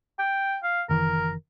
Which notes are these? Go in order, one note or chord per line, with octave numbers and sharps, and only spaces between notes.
G5
F5
F#1 D#3 E3 A#4